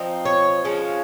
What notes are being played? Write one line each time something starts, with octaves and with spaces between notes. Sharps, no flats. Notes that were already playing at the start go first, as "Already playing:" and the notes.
Already playing: F3 C4 D#4
C#5
F3 G#3 C#4